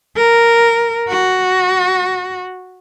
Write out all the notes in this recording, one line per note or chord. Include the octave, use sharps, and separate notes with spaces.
A#4
F#4